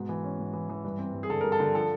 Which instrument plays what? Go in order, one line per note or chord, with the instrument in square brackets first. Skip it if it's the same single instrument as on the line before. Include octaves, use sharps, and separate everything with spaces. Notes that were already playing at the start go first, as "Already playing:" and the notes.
Already playing: [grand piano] G#2 B2
E3
C#4
G#2
E3
E3
G2
C4
G2
G#4
D3 A4
G3 A#4
A4
D3
F3 A4